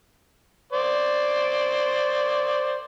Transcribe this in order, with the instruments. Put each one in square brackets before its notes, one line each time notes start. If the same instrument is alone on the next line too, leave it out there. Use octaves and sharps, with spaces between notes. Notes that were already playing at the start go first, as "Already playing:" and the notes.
[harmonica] C5 D5